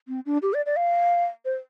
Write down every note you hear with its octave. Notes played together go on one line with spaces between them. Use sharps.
C4
D4
G4
D5
D5
F5
C5